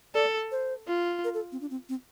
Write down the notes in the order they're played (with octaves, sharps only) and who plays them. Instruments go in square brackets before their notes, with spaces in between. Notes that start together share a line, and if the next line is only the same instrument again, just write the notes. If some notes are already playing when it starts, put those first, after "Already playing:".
[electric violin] A4 [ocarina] D5
[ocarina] C5
[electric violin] F4
[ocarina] A#4
A4
C4
D4
C4
C4